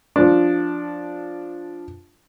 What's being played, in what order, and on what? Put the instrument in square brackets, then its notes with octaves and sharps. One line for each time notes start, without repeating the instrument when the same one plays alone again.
[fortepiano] F3 D4